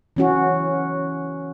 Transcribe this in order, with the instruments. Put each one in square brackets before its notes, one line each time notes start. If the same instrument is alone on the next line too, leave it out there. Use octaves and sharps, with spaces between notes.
[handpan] E3 C#4 F#4